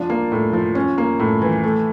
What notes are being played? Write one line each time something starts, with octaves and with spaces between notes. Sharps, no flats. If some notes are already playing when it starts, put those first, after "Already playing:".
Already playing: F3 D4
A#3
A2
F3
C#4
A#3
A2
E3
A3